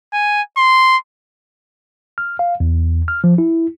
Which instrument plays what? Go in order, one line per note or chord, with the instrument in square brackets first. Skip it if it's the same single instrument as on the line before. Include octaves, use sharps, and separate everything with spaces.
[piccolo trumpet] G#5
C6
[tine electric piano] F6
F5
E2
F6
F3
E4